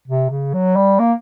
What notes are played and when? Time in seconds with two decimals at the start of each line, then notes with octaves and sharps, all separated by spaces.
0.08 C3
0.30 C#3
0.54 F#3
0.76 G3
0.99 A#3